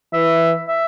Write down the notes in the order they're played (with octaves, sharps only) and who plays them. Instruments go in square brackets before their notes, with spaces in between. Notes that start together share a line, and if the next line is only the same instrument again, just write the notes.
[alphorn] E3 [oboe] E5
[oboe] E5